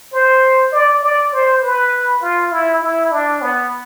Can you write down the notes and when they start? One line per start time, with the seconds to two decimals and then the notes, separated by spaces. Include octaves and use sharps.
0.13 C5
0.72 D5
1.03 D5
1.33 C5
1.62 B4
2.21 F4
2.51 E4
2.82 E4
3.11 D4
3.42 B3